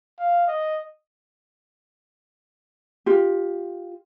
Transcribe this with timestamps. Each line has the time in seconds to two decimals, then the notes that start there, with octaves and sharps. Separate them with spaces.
0.19 F5
0.47 D#5
3.06 F4 G4